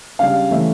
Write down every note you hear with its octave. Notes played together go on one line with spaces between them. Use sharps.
C#3 G3 D4 F5
C#3 E3 A3 C#4 E5